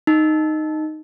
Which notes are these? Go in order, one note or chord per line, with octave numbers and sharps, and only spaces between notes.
D#4